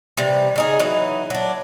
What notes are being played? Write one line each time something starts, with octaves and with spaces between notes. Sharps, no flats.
C3 E3 G3
C#3 D#4 G#4
E3 F#3 D#4 E4
F#3 D4